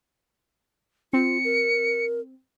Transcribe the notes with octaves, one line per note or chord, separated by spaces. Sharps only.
C4 F4 C#7
A#4